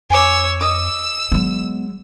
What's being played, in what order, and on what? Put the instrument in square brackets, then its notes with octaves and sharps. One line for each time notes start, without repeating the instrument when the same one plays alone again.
[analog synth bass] F2 [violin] C#5 E6 [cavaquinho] G#5 D6
[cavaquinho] D#5 D6 [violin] E6 E7
[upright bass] F#3 G#3 [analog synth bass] B3